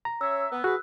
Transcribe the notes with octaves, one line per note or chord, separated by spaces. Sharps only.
A#5
C#4 C#5 E5 E6
B3
F#4 G#4 B4 F#6